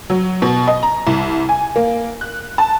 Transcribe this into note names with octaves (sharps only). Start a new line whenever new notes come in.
F#3
B2
D#5
A#5
C2
G#5
A#3
F#6
A5